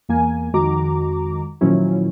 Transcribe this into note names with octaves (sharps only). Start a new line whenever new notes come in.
E2 A#3 G#5
F2 D#3 G#3 F#4 A#5 D6
A#2 D#3 F3 F#3 C#4 E4